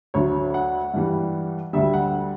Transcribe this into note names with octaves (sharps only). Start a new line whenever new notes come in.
D2 D3 F#3 C#5
F#5
G2 E3 G3
D2 D3 G3 E5
F#5